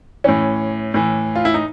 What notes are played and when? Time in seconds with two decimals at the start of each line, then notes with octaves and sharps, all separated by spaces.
0.24 A2 E3 C#4
0.94 A2 E3
1.35 F4
1.45 E4
1.54 D#4